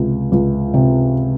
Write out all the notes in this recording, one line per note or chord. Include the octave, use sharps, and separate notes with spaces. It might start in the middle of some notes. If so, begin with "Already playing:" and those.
Already playing: C#2 C3
C#2
C3